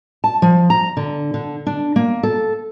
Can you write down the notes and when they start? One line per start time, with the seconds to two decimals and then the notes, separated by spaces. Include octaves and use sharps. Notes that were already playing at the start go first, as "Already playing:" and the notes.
0.24 A5
0.42 F3
0.70 A#5
0.97 D3
1.34 D3
1.66 D4
1.96 A#3
2.23 A4